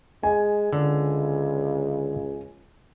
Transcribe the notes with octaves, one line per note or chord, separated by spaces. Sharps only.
G#3 G#5
C#2 D3